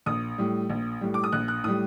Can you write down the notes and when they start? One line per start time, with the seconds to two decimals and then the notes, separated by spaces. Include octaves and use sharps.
0.06 A#1 D#6
0.38 A2 G3
0.70 A#1
1.01 A2 G3
1.14 D6
1.24 D#6
1.32 A#1 F#6
1.48 F#6
1.64 A2 G3 D#6